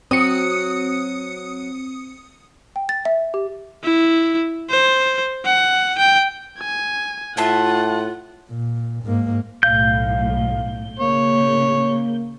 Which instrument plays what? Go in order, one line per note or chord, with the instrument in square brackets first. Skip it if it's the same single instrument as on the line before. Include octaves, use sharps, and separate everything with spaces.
[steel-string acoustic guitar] F#3 F#4 [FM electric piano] C4 [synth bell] D#6 C#7
[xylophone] G5
A6
E5
G4
[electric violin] E4
C5
F#5
G5
G#5
[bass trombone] A2 [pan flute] F4 [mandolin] E5 A5 C6 [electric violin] F#5
[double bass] A#2
G#2 A#3
[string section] B1 A2 [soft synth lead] F5 [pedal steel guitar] G6
[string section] A#2 C#3 [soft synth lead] A#3 [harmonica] C#5